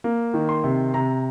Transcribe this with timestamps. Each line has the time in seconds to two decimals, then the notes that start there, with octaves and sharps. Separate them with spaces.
0.04 A#3
0.34 D#3
0.49 C6
0.64 C3
0.93 C3 A#5